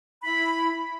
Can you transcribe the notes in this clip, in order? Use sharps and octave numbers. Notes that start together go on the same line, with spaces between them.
E4 B5